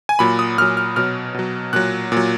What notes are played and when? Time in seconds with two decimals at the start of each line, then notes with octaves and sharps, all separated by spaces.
0.09 G#5
0.19 A#2 F#3 B5
0.39 D#6
0.58 A#2 F#3 F6
0.77 F6
0.96 B2 F#3 F6
1.34 B2 F#3
1.73 A#2 F#3 F#6
2.12 A#2 F#3